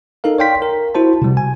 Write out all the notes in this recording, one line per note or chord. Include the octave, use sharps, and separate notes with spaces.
D#4 A4 A#4 F5
C#5 D5 F5 G5 C6 B6
A#4
E4 F#4 C5 A5
C3 G3
G#5